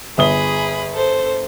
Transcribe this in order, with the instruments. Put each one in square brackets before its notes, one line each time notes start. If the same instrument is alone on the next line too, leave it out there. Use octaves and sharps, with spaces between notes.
[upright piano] G1 D#6 G7 [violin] G#4 B5
[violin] A4 C5